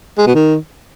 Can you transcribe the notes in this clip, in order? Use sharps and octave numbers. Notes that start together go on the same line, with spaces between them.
G#3
B2
D#3